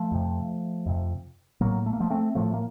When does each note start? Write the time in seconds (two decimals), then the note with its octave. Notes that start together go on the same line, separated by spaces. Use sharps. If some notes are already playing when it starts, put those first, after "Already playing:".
Already playing: F3 A3
0.12 F2 C3
0.86 F2 C3
1.61 A2 F#3 A#3
1.86 A3
1.93 A#3
2.00 F3 A3
2.10 A3 C4
2.35 A2 F3 A3
2.54 A#3